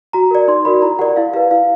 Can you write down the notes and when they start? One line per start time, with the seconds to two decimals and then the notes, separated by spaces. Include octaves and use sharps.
0.13 F#4 A#5
0.31 A#4 D5
0.48 D#4 C6
0.65 F#4 A#4 D5 B5
0.82 E4 A#5
0.99 G4 A#4 D5 F#5
1.16 E4 F5
1.34 G4 B4 D5 F5
1.51 E4 F5